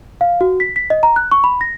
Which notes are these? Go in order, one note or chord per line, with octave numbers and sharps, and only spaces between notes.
F5
F#4
B6
B6
D#5
A#5
F#6
C#6
B5
A#6